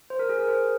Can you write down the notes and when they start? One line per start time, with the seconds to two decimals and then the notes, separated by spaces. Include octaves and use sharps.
0.10 C5
0.19 A#4
0.29 G#4
0.39 A#4
0.48 C5